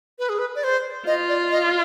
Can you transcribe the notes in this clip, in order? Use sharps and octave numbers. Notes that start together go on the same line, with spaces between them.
B4
G#4
B4
D5
C5
F4 D#5
D5
D#5